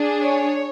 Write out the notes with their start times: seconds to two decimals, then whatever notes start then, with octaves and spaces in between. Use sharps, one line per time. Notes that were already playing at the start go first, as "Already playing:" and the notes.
Already playing: D4 G#4
0.21 C#5